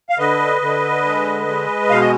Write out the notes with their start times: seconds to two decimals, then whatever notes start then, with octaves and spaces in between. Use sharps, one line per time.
0.09 F5
0.18 D3 B4 D#5
0.62 D3
1.04 G#3
1.47 G#3
1.89 B2 F5
2.00 D#5